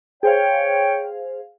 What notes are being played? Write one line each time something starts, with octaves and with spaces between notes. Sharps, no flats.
G#4 C5 C#5 F5 G5